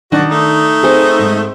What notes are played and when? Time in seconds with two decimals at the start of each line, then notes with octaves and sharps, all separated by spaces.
0.12 D#3 D4 F#4 D#5
0.30 A3 D#4
0.83 C4 G#4 C5
1.19 G#2